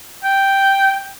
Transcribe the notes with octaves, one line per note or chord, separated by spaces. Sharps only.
G5